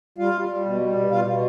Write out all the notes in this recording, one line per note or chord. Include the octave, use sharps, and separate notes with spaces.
G3 F4 F5
G3
G3
B2
G3
B2
B2 F4 F5
B2